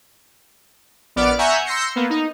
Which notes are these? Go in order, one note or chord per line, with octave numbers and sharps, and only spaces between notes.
A#1 B3 D5 D6 F6
E5 F#5 G#5 A#5 C#6 G6
C6 E6 G6 A#6 C7 C#7
A#3 B3
D#4